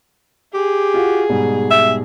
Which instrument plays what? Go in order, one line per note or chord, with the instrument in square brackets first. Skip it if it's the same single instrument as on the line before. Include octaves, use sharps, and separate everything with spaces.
[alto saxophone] G4 [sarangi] G#4
[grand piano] F4 F#4
G#2 B2 G3
[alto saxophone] E5